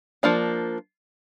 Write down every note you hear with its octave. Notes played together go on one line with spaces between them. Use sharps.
F3 A#3 D4